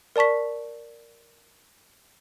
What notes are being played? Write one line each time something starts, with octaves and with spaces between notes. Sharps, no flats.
A#4 D5 A5 C#6 B6